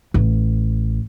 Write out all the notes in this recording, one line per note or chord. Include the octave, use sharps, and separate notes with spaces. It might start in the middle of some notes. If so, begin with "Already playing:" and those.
A1